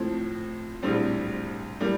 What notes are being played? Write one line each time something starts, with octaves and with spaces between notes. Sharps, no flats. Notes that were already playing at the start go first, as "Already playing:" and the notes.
Already playing: A2 F3 C4
A#1 A2 G3 C4
A2 G3 A#3